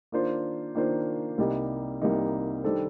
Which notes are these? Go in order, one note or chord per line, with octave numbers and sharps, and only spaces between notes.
D#3 A#3 D4 F4 C5
D#3 A#3 D4 F4 C5
C2 C3 G3 A#3 D#4
C2 C3 G3 A#3 D#4
D#3 G3 D4 A4 C5